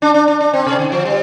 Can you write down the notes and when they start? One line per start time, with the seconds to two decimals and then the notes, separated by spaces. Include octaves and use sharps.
0.02 D4
0.14 D4
0.28 D4
0.40 D4
0.53 C4
0.67 C3
0.79 D3
0.92 F3
1.05 G3